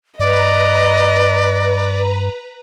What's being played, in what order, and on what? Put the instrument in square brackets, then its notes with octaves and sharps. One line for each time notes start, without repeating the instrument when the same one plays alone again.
[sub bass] G2 [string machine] B4 A#5 [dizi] D5 [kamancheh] D#5